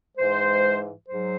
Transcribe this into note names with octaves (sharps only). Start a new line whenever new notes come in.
G#2 E3 G#3 C5
G#2 F#3 C5